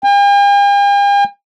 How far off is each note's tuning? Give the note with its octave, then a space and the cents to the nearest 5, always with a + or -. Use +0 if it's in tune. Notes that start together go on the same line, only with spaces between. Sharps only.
G5 +45